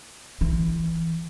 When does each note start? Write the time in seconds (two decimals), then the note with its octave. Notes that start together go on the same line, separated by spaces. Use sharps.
0.41 E3